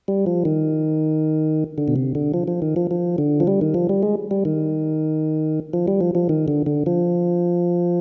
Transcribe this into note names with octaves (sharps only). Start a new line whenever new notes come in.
G3
F3
D#3
D3
B2
C3
D3
F3
F3
D#3
F3
F3
D3
F3
G3
D#3
F3
G3
G#3
G3
D#3
F3
G3
F3
F3
D#3
D3
D3
F3